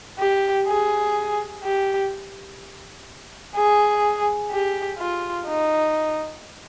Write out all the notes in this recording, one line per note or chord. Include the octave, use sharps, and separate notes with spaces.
G4
G#4
G4
G#4
G4
F4
D#4